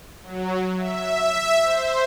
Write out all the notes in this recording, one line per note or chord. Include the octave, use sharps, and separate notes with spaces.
F#3
E5
C5